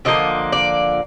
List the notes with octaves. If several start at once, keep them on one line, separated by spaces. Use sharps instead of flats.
D3 F3 A#3 D#5
D5